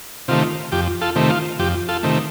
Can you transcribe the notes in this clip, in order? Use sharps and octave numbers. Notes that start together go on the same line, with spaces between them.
C3 D#3 A3 F4
F2 G4
F4 A4
C3 D#3 A3
F4
F2 G4
F4 A4
C3 D#3 A3